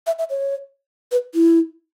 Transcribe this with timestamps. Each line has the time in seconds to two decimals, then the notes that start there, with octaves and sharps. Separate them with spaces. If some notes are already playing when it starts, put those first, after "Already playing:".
0.07 E5
0.19 E5
0.30 C#5
1.12 B4
1.34 E4